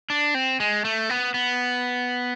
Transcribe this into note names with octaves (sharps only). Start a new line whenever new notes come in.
D4
C4
G#3
A3
B3
B3